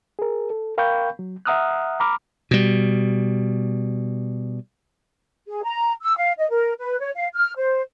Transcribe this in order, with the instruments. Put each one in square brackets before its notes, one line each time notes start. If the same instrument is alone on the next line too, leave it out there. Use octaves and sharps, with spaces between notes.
[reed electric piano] G#4 A#4
A4
A#4 F5 G5 B5 C#6 G6
F#3
E5 F#5 A#5 D#6 F6 F#6
A#5 B5 D6 F6
[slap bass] B2 G3
[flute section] G#4
A#5
E6
F5
D#5
A#4
B4
C#5
F5
F6
C5